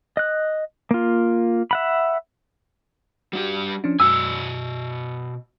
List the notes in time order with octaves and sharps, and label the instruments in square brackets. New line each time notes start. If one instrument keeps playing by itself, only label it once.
[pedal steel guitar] D#5 F#6
A#3 F4
E5 F#5 B5
[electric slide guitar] G3 D4 G4 [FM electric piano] F#4
[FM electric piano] F3 C#4 D4
[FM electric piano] F#2 [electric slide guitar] B2 F#4 G#5 [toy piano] E6